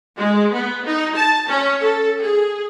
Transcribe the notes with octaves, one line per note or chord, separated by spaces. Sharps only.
G#3
B3
D#4
A5
C#4
A4
G#4